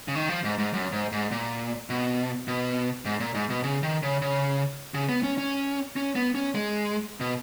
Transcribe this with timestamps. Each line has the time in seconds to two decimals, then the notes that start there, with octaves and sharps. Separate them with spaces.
0.08 C#3
0.15 D#3
0.29 F3
0.44 G#2
0.58 G#2
0.73 F#2
0.93 G#2
1.12 G#2
1.31 A#2
1.90 B2
2.48 B2
3.05 G#2
3.20 A#2
3.34 G#2
3.50 B2
3.64 C#3
3.83 D#3
4.03 C#3
4.22 C#3
4.94 C#3
5.09 B3
5.23 C#4
5.38 C#4
5.96 C#4
6.15 B3
6.35 C#4
6.55 G#3
7.21 B2